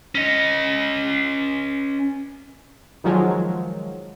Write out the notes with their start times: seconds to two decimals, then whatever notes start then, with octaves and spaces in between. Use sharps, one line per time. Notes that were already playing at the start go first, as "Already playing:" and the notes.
0.15 C#4 D#5
3.04 D#3 F3 F#3 G#3